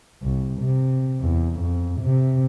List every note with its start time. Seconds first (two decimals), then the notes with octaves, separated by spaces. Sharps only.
0.22 C2
0.61 C3
1.21 E2
1.60 F2
2.01 C3